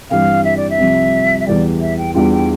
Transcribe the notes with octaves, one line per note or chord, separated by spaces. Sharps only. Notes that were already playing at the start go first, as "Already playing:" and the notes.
G2 E3 G3 C4 F5
E5
D5
E5
C2 C3 F3
E5
E2 E3 G3 D5
E5
G5
E2 E3 G3 D4 F4 G5
G5